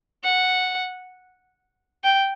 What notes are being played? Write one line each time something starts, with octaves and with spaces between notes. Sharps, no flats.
F#5
G5